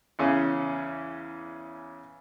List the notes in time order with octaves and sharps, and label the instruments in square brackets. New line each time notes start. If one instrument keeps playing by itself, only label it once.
[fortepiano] E2 C#3 C#4